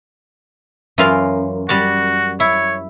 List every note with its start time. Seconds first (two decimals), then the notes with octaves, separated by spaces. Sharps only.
0.98 F#2 E3 F4 F5
1.69 G3 F#4 D5
2.40 E4 C#5